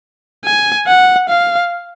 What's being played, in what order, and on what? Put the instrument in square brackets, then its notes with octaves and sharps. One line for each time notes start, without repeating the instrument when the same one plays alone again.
[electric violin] G#5
F#5
F5